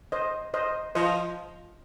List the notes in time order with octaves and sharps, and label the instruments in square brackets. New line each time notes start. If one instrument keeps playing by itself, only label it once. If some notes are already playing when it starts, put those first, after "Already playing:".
[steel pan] C5 D#5
C5 D#5
[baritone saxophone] F3 [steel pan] C5 D#5